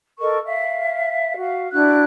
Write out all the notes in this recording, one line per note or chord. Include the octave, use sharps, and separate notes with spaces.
A4 A#4 D#5 C#6
E5 F5
F#4 F5
D4 E4 F#4 F#6